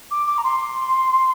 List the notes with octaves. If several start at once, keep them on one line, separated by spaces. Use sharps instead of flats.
D6
D6
A#5
C6